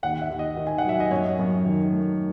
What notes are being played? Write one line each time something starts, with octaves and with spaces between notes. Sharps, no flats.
D#2 F#5
E5
D#2
D#5
D#3
G#5
F#5
F#3 E5
D#5
F#2 C#5
F#2
D#3
A3